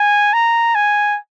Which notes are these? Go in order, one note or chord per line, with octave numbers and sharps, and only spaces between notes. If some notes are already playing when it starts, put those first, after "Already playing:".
Already playing: G#5
A#5
G#5